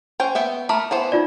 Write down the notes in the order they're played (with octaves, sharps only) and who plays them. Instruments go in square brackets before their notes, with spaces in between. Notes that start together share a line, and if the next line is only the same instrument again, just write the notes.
[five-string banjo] C#4 C5 G5
B3 E5 G5
[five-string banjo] A3 A#4 B5 [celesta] A5
[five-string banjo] E3 B3 C5
[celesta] D#4 F4 D5